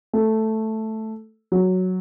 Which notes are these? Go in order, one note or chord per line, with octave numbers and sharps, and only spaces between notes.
A3
F#3